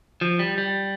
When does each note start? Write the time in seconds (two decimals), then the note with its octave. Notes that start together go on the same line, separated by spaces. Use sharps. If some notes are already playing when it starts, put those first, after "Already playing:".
0.21 F3
0.39 G3
0.58 G3